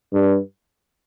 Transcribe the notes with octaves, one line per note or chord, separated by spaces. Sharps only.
G2